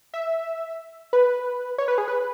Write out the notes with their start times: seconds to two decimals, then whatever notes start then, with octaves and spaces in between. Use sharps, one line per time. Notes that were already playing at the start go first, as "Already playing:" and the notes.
0.14 E5
1.13 B4
1.78 C#5
1.88 B4
1.98 G#4
2.08 B4